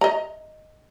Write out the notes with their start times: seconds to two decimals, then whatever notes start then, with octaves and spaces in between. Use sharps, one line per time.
0.01 D#5 A#5